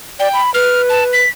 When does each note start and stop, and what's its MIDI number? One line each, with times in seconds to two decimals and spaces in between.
0.19 0.28 74
0.19 0.41 79
0.34 0.53 83
0.54 1.21 71
0.54 0.82 89
0.89 1.04 81
1.13 1.29 95